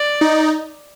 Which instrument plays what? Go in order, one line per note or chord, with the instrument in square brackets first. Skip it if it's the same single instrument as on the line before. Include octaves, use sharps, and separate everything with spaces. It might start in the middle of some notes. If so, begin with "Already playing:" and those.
Already playing: [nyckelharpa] D5
[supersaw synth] D#4